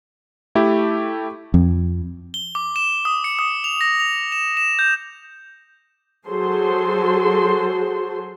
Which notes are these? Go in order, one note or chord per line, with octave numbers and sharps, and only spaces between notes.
A3 E4 G4
F2
G7
D6
E7
D#6
C#7
D#6
F7
A#6
F7
E7
E7
G6
F#3 F#4 G#4 A4 C5 C6